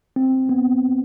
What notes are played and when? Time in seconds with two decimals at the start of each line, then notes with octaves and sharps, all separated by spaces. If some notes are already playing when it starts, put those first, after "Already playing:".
0.16 C4
0.49 B3